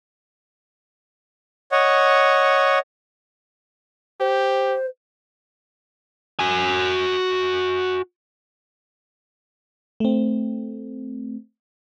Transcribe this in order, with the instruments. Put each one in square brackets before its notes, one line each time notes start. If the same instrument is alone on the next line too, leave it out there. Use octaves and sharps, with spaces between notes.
[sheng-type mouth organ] C#5 D#5 F#5
[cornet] G4 [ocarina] C5
[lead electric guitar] F#4 G#5
[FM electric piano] A3 C4